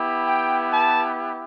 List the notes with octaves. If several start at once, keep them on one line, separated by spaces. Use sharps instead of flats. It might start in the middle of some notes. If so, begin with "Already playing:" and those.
Already playing: B3 E4 G4
G5
A5